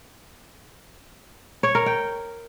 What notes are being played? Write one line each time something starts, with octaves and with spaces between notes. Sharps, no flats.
C#5
A#4
G5